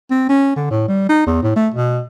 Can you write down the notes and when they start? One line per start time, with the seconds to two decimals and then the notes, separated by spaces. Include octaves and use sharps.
0.10 C4
0.29 C#4
0.56 D3
0.70 A2
0.88 G3
1.09 D#4
1.26 E2
1.43 A2
1.56 A3
1.74 B2